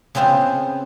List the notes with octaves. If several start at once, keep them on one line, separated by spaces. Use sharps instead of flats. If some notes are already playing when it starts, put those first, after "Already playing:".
C#3 B3 C4 F4 C5